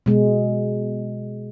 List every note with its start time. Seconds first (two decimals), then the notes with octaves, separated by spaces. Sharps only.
0.06 B2 G#3